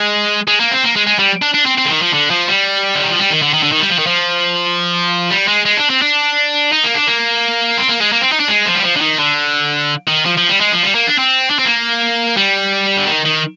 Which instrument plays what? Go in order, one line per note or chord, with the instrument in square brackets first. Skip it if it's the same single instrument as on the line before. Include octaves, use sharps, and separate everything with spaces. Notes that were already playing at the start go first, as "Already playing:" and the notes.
Already playing: [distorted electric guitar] G#3
G#3
A#3
C4
A#3
G#3
G#3
G3
D4
D4
C4
C4
D3
D#3
F3
D3
F3
G3
D3
D#3
F3
G3
D#3
D3
D#3
D3
D#3
G3
F3
D#3
F3
G3
G#3
G#3
D4
C4
D4
D#4
A#3
D4
A#3
C4
A#3
G#3
A#3
C4
D#4
D4
G#3
F3
G3
F3
D3
D#3
D3
D#3
F3
F3
G3
G#3
F3
G3
A#3
D4
C4
D4
C4
A#3
G3
D3
D#3
D#3